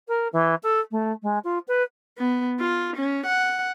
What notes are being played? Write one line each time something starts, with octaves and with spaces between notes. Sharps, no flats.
A#4
E3
A4
A3
G#3
F4
B4
B3
F4
C#4
F#5